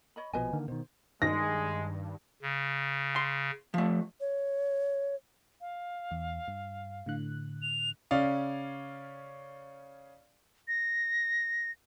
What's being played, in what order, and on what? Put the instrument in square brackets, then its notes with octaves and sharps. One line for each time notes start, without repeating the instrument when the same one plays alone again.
[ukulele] C#5 D#5 B5
[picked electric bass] A#1 B2 F3 [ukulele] B4 D#5 G#5
[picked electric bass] D3 D#3 A#3
[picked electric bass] B2 D#3 [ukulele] C5
[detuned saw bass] G2 [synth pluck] D#3 [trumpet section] G#3 [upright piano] A#6
[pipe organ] C#3
[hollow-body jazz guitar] C6
F3 A3
[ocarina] C#5
[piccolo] F5
[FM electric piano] E2
G2
A2 D3 F#6
[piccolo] F7
[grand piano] C#3 C#4 D5 F5
[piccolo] A#6